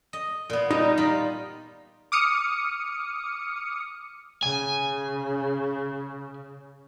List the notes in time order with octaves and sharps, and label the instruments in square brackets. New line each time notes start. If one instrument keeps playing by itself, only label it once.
[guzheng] D#5
A#2 B3
[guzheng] G3 [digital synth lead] D#4
[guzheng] G3 F4 B5
[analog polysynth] D6 D#6 F6 C#7
[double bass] C#3 [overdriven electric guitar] G#5